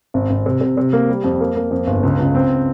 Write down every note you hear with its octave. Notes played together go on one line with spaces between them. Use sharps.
G#1
G#1
C3
C3
C3
A#3
G3
F2
A#3
A#3
F2
G1
C#2
C#2
C4